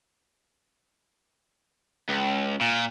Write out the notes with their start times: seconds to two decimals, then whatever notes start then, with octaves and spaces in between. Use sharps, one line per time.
2.09 C#2
2.61 A#2